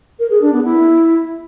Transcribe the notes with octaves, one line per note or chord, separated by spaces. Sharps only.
A#4
G#4
D4
B3
E4